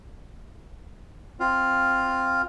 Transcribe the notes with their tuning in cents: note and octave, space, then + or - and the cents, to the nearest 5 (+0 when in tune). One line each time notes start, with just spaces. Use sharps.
C4 +0 F4 +0 F5 +0